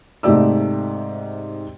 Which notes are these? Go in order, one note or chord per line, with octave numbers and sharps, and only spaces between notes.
G#2 C3 A3 G4 D5 E6